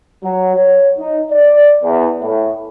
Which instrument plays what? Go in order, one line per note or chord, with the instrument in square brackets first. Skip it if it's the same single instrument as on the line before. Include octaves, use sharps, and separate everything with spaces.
[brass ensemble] F#3
C#5
D#4
D5
E2
A2